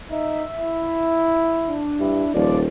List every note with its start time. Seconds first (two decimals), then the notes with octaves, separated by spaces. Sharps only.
0.11 D#4 E5
0.58 E4
1.67 D4
2.00 G2 E4
2.34 D#1 F3 D5